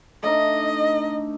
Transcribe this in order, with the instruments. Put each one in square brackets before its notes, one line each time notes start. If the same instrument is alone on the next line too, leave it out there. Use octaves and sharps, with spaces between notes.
[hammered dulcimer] A3 D4 D#4 [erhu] D#5